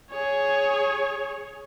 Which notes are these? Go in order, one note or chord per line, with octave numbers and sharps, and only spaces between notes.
G#4 C#5